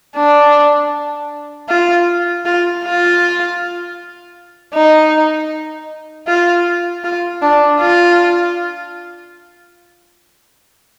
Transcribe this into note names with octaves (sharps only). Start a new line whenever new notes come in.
D4
F4
F4
F4
D#4
F4
F4
D4
F4